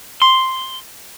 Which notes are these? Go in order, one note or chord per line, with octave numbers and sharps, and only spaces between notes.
C6